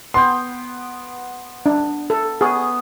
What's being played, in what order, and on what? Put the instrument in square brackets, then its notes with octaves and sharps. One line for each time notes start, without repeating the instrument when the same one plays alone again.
[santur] B3 G5 [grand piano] C6
[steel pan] D4
A4
[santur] B3 C#6 D#6 [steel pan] G#4